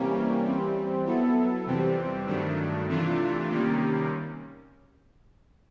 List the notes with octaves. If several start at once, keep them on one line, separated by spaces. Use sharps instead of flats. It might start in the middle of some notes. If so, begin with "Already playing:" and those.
Already playing: C3 E3 G3 A#3 C#4
E3 G3 C4
F#3 B3 E4 A4
F2 C3 E3 G3 C4
G2 D#3 F#3 A3 D4
C3 E3 A3 D4 F4
C3 D#3 G3 A#3 C#4